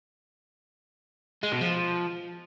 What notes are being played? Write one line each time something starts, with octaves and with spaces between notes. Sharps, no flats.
G#3
B2
F3